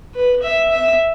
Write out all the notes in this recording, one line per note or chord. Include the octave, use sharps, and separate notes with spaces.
B4
E5
E5